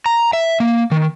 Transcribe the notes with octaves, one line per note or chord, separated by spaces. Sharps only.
A#5
E5
A#3
D#3